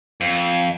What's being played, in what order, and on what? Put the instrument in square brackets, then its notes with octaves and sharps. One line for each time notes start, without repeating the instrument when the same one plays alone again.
[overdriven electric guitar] F2